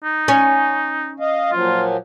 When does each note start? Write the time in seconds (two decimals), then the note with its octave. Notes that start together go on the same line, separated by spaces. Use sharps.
0.04 D#4
0.28 C#4
1.20 D#5 F5
1.52 A#2 F3 F#3 F4